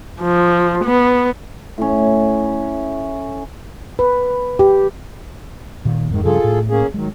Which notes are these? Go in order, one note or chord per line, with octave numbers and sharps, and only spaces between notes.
F3
B3
A2 C#4
B4
G4
A#2 D#3
F2 G#2 D#3 G#3
G2 C#3 F3 F4 G#4 A4
A2
A#3 C#4 G#4
D#3 F#3 G#3